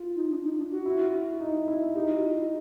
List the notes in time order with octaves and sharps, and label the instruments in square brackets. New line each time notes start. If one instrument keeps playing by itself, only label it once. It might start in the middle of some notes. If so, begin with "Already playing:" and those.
Already playing: [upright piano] F4
[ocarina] D#4
D4
D#4
D4
F#4
[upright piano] E4
D#4
E4
[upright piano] D#4 [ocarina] G4
[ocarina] F#4
F4
E4